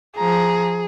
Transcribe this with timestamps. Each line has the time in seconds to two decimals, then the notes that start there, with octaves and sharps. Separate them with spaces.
0.18 F3 G#4 A#5